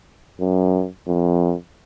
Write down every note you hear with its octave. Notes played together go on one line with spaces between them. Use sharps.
F#2
F2